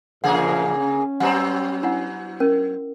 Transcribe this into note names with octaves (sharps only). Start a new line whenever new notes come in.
F#2 A#2 C#3 F3 A#3 G#4 F#5
C#4
F#3 B3 C4 F#5 A#5
D4 E4 F#5
C#4 A#4